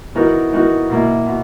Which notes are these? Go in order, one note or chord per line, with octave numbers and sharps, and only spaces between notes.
E3 B3 D#4 F#4 A#4
E3 B3 D#4 F#4 A#4
B2 A#3 E4
B2